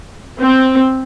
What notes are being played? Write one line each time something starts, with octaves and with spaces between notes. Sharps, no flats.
C4